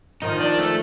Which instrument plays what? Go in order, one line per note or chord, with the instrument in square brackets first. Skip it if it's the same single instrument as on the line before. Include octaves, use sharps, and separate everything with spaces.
[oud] D#3 F3 [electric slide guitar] D#4
[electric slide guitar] D4
A3